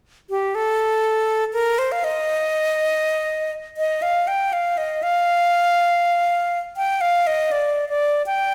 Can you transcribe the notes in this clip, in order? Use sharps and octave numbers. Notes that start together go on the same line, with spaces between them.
G4
A4
A#4
C5
F5
D#5
D#5
F5
G5
F5
D#5
F5
G5
F5
D#5
D5
D5
G5